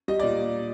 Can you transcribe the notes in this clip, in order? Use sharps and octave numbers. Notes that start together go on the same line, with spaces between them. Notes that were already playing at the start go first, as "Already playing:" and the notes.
G3 D#5
D5
A#2